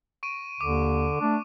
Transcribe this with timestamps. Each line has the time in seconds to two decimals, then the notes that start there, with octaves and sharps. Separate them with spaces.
0.23 C#6 D7 D#7
0.61 D#2 D3 D6
1.21 A3 D4